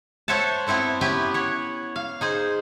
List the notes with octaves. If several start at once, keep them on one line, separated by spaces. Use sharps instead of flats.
A4 C5 C#5 E5 F#5 A5
B3 C4 E4 A4 C5
B3 C#4 E4 G4 B4
C#5 F#5
F5
D#4 G#4 C5